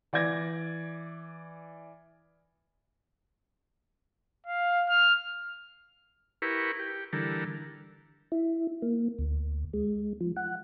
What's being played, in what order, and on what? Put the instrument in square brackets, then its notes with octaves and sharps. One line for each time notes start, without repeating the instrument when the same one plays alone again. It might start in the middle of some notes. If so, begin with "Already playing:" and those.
[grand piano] E3 D5 D6 G#6 A#6
[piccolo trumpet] F5
F6
[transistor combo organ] E4 G4 A#4 B4 C#6
G4
D3 E3 G3 A4 A#4
[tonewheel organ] E4
A#3
D2
G#3
F3
F#5